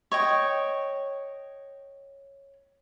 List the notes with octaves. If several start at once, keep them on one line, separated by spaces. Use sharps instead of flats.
C#5 D#5 G5